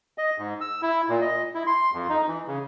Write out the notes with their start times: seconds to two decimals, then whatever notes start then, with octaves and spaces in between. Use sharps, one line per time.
0.18 D#5
0.38 G#2
0.61 E6
0.82 E4
1.09 A#2
1.21 D#5
1.55 E4
1.67 C6
1.93 F2
2.09 D#4
2.28 E3
2.47 C#3